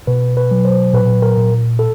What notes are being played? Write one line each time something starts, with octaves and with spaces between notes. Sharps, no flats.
B2 B4
B4
F#3
C5
A#2 B4
A#4
A#2
A4